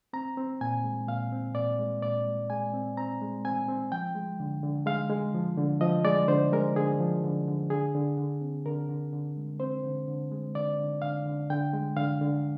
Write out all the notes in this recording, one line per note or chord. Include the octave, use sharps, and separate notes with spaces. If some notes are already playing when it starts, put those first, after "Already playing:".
C4 A#5
C4
A#2 G#5
G#3
A#2 F5
C4
A#2 D5
G#3
A#2 D5
G#3
G#3 G#5
C4
C4 A#5
G#3
C4 G#5
C4
F3 G5
G#3
D3
D3
G#3 F5
G#3
F3
D3
F3 D#5
G#3 D5
D3 C5
G#3 A#4
D3 G#4
F3
D3
D3
D3 G#4
D3
D3
C4
D3 A#4
D3
D3
G#3
C4 C5
D3
D3
G#3
D3 D5
D3
D3 F5
D3
D3 G5
G#3
D3 F5
D3